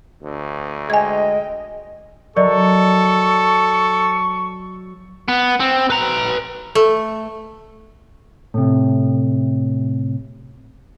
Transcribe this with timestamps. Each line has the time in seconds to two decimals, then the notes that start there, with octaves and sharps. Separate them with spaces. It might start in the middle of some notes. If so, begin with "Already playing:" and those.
0.23 D2
0.90 G#3 D#5 G5 G#5 G#6
2.36 F#3 A4 A#4 D5 D#5 C#6
5.28 B3
5.60 C4
5.90 B4 A#5
6.75 A3
8.54 A2 C3